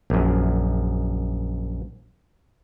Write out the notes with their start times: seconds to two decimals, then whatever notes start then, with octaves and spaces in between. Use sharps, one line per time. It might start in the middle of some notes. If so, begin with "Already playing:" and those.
0.10 A#1 F#2